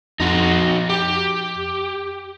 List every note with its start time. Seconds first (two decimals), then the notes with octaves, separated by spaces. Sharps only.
0.20 F2 D#4 F#4
0.89 G4